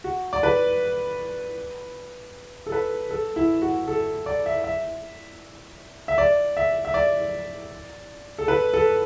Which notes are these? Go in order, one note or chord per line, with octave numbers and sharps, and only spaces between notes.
F#4
D5
B4
A4
B4
A4
E4
F#4
A4
D5
E5
E5
E5
D5
E5
E5
D5
A4
B4
A4